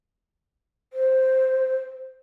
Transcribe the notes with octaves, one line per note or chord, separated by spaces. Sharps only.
C5